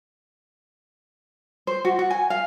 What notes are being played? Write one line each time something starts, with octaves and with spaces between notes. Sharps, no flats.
C5
F#4
F#4
G#5
F5